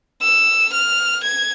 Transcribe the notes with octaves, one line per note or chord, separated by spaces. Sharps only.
E6
F6
G#6